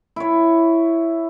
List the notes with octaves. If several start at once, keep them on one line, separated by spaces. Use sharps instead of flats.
E4 C#5